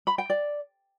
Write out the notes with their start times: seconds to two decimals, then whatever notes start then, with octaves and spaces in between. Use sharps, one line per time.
0.07 B5
0.18 G5
0.30 D5